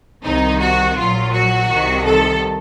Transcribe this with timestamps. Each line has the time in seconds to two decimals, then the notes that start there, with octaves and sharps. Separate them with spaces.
0.24 C2 C3 D#3 D#4
0.60 F#4
0.96 A#1 A#2 F#3 F4
1.33 F#4
1.69 C2 C3 D#3
2.05 A4